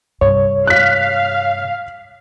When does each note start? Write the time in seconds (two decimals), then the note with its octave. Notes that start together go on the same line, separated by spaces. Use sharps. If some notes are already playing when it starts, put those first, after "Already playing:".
0.21 G2 C3 C#5
0.67 F5 F#6 B6